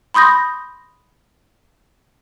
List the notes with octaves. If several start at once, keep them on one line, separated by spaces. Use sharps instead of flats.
B5 C6 D#6 G6 A#6